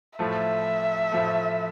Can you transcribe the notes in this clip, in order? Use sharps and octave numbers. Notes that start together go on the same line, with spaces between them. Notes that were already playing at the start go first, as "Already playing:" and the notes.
A2 F3 A3 E5
A2 F3 A3